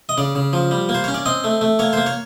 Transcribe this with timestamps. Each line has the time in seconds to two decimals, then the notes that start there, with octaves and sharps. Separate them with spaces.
0.09 D#5
0.18 C#3 D5
0.35 C#3
0.53 F3
0.71 G3
0.89 A#3
0.94 C5
1.04 C#4 C#5
1.14 D5
1.26 C4 D#5
1.44 A3
1.61 A3
1.79 A#3 C#5
1.93 A#3 C5
2.06 C#5